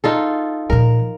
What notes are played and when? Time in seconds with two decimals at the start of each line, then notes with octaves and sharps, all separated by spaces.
0.04 D#4 F4 A4
0.70 A#2 F3 A#4